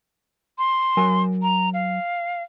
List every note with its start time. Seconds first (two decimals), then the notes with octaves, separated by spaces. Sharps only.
0.58 C6
0.97 F#3 A#4 G#5
1.42 A#5
1.74 F5